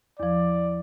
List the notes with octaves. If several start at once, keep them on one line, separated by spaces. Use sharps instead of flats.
E2 F3 D5